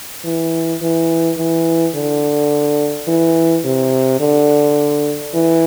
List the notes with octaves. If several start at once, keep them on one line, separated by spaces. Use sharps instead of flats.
E3
E3
E3
D3
E3
C3
D3
E3